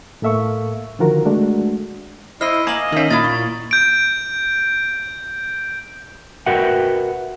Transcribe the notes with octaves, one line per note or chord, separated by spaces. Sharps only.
A2 A#3 A4 E5 F5 C#6
D3 D#3 F3 F4 F#4 A#4
G#3 A3 D4 F#4
E4 C5 D#5 F6 C7
A#3 D#5 G#5 A#5 D#6 F#7
D#3 A#3 C#4 E5
A#2 A#3 E4 D#6 A6
C#6
G6 D7
F#4 A#4 B4 E5 F#5 G5